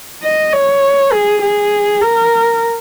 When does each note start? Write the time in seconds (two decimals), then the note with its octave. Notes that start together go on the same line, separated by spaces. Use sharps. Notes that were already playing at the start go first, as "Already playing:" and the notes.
0.23 D#5
0.53 C#5
1.12 G#4
1.42 G#4
2.02 A#4